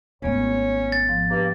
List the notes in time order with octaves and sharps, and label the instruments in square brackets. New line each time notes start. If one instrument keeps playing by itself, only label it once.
[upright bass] G#1 A3 [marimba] G#3 B3 [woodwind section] C#4 C#5
[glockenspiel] A6
[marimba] G#2 F3
[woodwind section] G2 A#3 [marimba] A#5